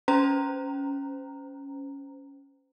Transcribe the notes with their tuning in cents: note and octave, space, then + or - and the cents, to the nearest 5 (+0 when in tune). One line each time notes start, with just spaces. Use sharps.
C#4 +5 C5 -30 A#5 -10